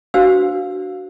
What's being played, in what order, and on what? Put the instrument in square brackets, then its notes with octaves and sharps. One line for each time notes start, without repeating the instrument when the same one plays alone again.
[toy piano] D4 F#4 B4 C5 F5 E6